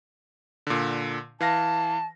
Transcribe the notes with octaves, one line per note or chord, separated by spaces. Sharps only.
A#2 D3
E3 F5 A5 A#6